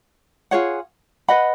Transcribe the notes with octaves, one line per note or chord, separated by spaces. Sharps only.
F4 G#4 C#5 F#5
B4 D#5 F#5 B5